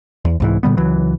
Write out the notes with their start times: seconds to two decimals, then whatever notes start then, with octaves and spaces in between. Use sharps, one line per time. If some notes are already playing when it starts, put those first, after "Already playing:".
0.25 E2
0.40 C2 G#2 E3
0.63 A#2 D3 G3 B3
0.77 C#2 E3 F#3